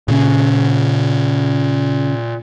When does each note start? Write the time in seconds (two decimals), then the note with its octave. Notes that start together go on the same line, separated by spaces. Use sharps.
0.08 A#2 C#3 C#4